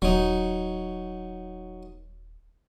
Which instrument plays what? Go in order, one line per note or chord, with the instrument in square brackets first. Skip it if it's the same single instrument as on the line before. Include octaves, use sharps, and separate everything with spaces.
[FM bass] D#1 [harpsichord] F#3 D#4